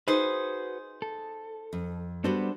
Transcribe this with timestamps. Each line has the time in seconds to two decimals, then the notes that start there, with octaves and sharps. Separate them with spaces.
0.08 D#4 F#4 G#4 B4 C5
1.02 A4
1.73 F2
2.24 G3 B3 D4 F#4 A4 C5